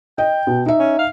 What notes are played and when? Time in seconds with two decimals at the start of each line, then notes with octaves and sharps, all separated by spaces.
0.18 D#5 G5
0.47 B2
0.66 D#4 E5
0.79 C#4
0.99 F5